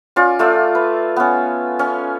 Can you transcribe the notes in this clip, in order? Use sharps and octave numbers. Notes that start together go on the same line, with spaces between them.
C#4 F4 D5
A3 F4 D5 E6
B4
B3 C#4
C#4